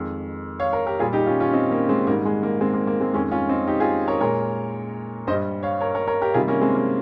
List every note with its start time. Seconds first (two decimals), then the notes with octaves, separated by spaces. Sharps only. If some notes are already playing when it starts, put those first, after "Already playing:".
Already playing: F2 D#3 G#3
0.60 C#5 F5
0.73 A#4 C#5
0.86 G4 A#4
0.99 A#2 G3 F4 G#4
1.13 D#4 G4
1.26 C#4 F4
1.40 C#4 F4
1.53 C4 D#4
1.71 A#3 C#4
1.89 G#3 C4
2.07 G#2 D#3 G3 A#3
2.25 G#3
2.43 A#3
2.60 G#3 C4
2.74 A#3
2.87 A#3
3.00 G#3 C4
3.13 F2 D#3 G#3 A#3 C#4
3.31 C#4 F4
3.49 C4 D#4
3.68 D#4 G4
3.80 F4 G#4
4.08 A#4 C#5
4.20 A#2 G#3 A#4 C#5
5.27 G2 C5 D#5
5.31 G3
5.63 C#5 F5
5.81 A#4 C#5
5.95 A#4 C#5
6.07 A#4 C#5
6.21 G4 A#4
6.34 C3 D#3 G3 F4 G#4
6.48 A#3 C#4
6.61 G#3 C4
6.75 A#3